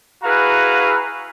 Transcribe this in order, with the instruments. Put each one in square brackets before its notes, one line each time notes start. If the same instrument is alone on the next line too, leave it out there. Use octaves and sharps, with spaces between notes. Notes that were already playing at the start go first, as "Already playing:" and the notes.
[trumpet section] E4 F#4 G#4 B4 F5 A#5